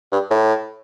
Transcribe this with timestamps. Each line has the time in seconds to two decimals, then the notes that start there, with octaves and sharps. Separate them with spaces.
0.12 G2
0.31 A2